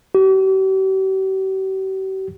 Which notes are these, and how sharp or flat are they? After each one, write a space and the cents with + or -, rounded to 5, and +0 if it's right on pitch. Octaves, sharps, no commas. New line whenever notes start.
G4 -45